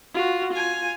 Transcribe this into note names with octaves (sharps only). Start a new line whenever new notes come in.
F4 F#4
F4 G#5